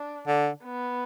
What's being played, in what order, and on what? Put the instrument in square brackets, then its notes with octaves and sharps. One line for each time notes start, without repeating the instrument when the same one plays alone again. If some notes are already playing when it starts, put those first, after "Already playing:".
Already playing: [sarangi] D4
[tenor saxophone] D3
[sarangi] B3